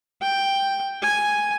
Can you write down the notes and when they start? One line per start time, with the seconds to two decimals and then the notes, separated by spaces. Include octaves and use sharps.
0.22 G5
1.02 G#5